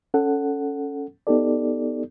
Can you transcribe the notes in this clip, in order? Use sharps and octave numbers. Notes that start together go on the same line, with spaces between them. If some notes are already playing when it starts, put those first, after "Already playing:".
C#4 A4 F#5
B3 D#4 G4 A4 D5